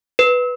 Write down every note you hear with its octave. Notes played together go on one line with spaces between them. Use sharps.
B4